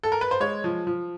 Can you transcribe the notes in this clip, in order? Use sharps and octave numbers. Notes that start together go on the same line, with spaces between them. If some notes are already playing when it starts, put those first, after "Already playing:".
A4
A#4
B4
C5
G#3 C#5
F3
F3